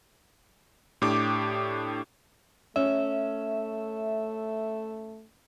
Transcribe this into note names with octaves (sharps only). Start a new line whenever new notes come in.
A2 D4 G4 D6
A3 C#4 E5